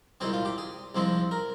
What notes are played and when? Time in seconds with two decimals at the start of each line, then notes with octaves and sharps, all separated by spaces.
0.20 C2 A#2 G#3 C4 G#4
0.33 F4
0.45 G4
0.58 G#4
0.94 C2 C3 F3 G#3 C4
1.31 A#4